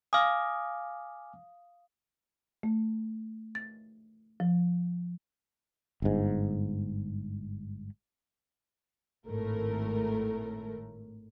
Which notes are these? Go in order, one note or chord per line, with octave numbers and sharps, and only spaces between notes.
F5 G#5 D6 D#6 F6
A3
A6
F3
G1 G#2
G#1 A2 A3 A#4